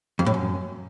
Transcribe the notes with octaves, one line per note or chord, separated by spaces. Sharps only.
F2
A2
F#2